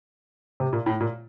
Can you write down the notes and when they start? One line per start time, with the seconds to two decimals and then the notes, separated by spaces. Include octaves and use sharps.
0.60 C3
0.73 A#2
0.86 A2
1.01 A#2